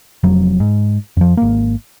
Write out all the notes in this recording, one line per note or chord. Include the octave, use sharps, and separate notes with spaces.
F1 F2 F#3
G#2
F2 F3
G#1 A#3